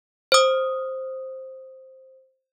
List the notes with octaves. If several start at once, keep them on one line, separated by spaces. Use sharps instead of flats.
C5 D#6